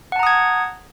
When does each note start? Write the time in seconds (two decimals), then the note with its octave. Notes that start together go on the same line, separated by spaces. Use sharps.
0.12 F#5
0.16 A5
0.19 A#5
0.23 D#6
0.27 G#6